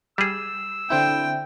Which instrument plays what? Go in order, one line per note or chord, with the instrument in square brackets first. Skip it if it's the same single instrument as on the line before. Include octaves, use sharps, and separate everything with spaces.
[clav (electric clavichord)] G3 G#4 [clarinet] E6
[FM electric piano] D3 C4 E4 [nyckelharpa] G5